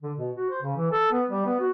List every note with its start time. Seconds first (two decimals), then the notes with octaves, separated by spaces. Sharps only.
0.02 D3
0.17 B2
0.36 F#4
0.50 C5
0.62 C#3
0.76 E3
0.91 A4
1.11 B3
1.29 G3
1.45 B3
1.60 F#4